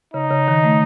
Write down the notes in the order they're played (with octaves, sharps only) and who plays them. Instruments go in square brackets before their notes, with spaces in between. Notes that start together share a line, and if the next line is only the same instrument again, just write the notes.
[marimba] C#3 [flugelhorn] D#4
[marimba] C#3
D#3
A3